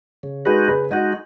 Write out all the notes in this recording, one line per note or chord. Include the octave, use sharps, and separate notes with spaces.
C#3
G#3 D#4 F#4 G#4 B4
C#3 G#4 B4
G#3 D#4 F#4 D#5 F#5